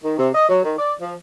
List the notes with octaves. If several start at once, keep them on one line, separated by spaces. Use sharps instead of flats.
D#3
C3
D#5
F#3
D#3
D5
F3